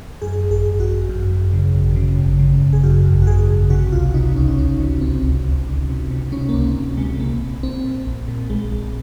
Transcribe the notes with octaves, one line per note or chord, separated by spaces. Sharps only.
F#2 G#4
G#1
G#4
G#1
F#4
G#1
F#2
F#2
C#3
G#1
C#3
G#1
C#3
G#1
G#4
F#2 F#4
G#1
F#4
C#3 G#4
G#1
C3 F#4
C#2 F4
C3 D#4
C#2 C#4
D#4
C#2 C#4
C3
C#2 C4
C#2
C#2
C#2
C3
C3
C3 C#4
A#3
C#2 C4
C#2
C3 G#3
A#1 A#3
A#1
A#1 C4
A#2
A#1
A#2
A#1 G#3
A#1